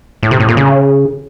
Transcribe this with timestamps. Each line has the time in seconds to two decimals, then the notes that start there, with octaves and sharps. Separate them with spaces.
0.23 A2
0.31 C3
0.40 A2
0.48 A#2
0.57 C#3